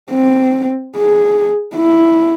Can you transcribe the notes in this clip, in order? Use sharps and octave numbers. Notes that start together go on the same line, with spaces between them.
C4
G#4
E4